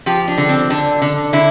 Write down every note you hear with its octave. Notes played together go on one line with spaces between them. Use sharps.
F3 G4
D4
D3
C4
D3 D4
D3
D3 E4